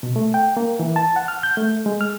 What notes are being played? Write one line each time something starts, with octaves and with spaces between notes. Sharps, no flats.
B2
A3
G5
A#3
E3
A5
F#5
F6
G6
A3
G#3
F6